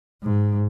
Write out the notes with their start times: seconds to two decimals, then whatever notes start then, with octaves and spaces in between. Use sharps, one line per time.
0.23 G#2